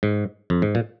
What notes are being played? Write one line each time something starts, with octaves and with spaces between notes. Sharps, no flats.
G#2
F2
G#2
A#2